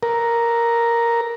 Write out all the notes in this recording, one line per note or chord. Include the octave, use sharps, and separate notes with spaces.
A#4